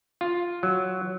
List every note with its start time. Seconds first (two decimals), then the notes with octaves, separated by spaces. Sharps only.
0.21 F4
0.63 F#3